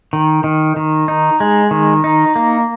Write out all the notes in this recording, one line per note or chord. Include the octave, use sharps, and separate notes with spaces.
D#3
D#3
D#3
D#4
G#3
D#3
D#4
A#3